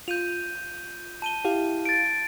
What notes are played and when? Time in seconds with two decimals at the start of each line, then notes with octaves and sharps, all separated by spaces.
0.08 F4 G6 D#7 F7
1.22 A5 D#7 G7
1.45 E4 G4 F5
1.85 A6 D7